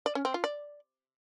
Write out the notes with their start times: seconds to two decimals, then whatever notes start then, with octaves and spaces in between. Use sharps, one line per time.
0.06 D5
0.15 C#4
0.25 C4
0.34 F4
0.44 D5